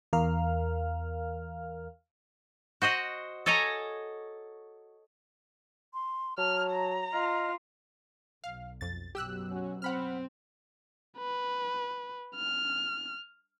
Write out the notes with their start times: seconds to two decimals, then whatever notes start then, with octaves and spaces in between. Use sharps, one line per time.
0.13 E2 A#4 F5 F6
2.82 F#4 C5 D#5 F#5
3.46 A4 C#5 D#5 G#5 A#5
5.92 C6
6.38 F#3 A5 F6
6.71 A#5
7.12 F4 D#5 F6
8.44 B1 F5
8.81 F2 A6
9.15 F#2 B2 F#3 G4 E6 F#6
9.51 C#4 F#4
9.82 C4 F#5 B5 F6
11.19 B4
12.36 F6